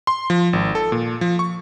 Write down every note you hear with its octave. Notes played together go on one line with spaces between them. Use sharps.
C6
F3
G#1
A4
A#2
F3
C#6